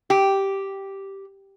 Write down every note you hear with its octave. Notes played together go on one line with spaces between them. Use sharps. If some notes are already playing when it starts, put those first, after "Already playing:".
G4